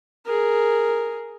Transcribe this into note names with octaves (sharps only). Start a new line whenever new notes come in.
G#4 A#4